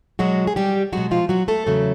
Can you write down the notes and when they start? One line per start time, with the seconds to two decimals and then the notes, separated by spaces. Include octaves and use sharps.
0.19 B2 F#3 G#3 F#4
0.47 G#4
0.56 G3 G4
0.92 B2 F#3 G#3 F#4
1.11 F3 F4
1.29 F#3 F#4
1.48 A3 A4
1.66 E2 C#3 F#3 A3